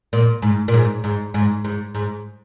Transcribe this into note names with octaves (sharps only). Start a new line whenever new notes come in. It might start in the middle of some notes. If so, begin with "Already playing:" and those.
A#2
G#2
A#2
G#2
G#2
G#2
G#2
G#2